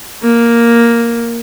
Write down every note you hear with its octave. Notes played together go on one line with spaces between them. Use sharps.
A#3